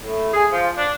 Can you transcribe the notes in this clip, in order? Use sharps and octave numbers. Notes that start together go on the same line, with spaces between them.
A2
G#4
F3
D4